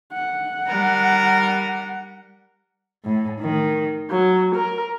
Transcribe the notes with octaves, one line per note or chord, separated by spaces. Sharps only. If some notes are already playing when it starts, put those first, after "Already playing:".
F#5
G3 A#4
A2
D#3
F#3
A#4